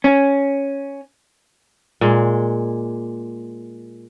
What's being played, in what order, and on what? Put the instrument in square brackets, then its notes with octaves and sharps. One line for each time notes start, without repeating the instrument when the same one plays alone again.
[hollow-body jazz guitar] C#4
[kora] A#2 G#3